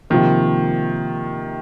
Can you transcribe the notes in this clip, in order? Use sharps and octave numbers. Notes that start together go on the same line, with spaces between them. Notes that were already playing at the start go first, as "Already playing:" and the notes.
C3 D#3 F3 A#3